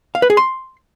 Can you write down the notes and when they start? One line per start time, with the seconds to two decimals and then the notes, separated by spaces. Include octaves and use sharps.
0.15 F5
0.22 B4
0.30 G#4
0.37 C6